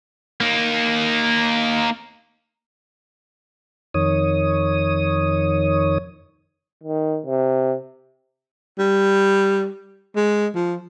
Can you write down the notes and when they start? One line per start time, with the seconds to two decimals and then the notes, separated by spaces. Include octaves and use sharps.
0.41 A#3 D#4
3.94 F2 D#3 C#5 D#6
6.83 D#3
7.26 C3
8.78 G3
10.16 G#3
10.55 F3